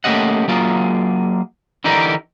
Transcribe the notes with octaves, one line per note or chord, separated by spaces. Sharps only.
A3 A#3 C#4 G4 D#5 F#5
F#3 A#3 F4 G#4
D3 E3 D#4 G4 A#4 D5